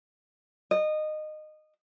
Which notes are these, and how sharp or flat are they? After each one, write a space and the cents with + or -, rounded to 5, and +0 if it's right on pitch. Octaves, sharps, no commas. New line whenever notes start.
D#5 -20